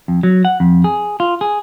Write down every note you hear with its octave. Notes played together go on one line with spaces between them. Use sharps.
F2
F#3
F#5
F2
G#4
F4
G#4